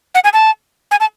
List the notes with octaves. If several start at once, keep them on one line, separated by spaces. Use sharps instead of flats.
F#5
G#5
A5
G#5
A5